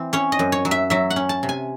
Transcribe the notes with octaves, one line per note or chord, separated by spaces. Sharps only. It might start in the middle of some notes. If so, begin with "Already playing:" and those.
Already playing: E3 C4
C#4 C#5
D#5
F#2
C#5
F#3
E5
F#3 E5
F#5
C#4
A5
C3
G#5